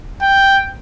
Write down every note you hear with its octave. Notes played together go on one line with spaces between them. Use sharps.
G5